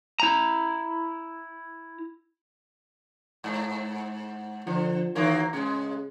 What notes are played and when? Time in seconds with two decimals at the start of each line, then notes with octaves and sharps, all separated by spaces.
0.20 E4 A#5
3.44 G#2
4.67 D3 F3
5.15 D#3 E3 F#3 A#3
5.53 A2 C#3 G#3